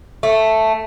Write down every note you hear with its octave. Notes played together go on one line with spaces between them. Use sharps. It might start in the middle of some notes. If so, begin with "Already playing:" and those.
A3